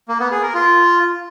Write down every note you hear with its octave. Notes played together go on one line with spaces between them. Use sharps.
A#3
B3
G#4
A#4
F4